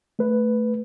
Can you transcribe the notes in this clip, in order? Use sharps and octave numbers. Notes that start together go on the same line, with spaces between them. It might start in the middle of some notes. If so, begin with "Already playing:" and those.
A3 B4